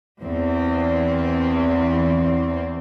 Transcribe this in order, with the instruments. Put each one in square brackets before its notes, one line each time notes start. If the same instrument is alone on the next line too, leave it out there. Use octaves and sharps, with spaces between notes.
[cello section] E2 C4